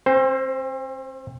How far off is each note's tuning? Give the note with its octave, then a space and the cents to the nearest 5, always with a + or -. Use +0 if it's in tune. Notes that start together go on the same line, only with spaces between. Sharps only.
C4 +40 C5 +0